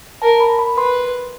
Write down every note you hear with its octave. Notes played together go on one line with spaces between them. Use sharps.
A#4 A5
B5
B5
B4 C6